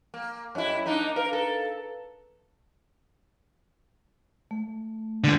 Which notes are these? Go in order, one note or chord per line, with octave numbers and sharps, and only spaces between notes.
A#3
F#2 E4 C#5 D#5 E5
A#3 D4 D#4 A#5
A#4 B4 F5 A#5
A4
A3
C#2 D3